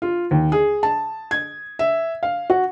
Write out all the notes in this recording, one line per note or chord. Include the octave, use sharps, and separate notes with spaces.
F4
D#2
G#4
A5
G#6
E5
F5
F#4